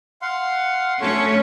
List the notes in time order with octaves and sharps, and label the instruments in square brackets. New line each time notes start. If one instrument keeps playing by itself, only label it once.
[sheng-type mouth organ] F5 F#5 C6
[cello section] A3 C#4 [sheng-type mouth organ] A4 C#5 C#6